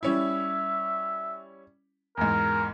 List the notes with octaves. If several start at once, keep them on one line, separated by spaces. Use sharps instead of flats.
G3 C#4 E4 E5
E2 G#2 A#4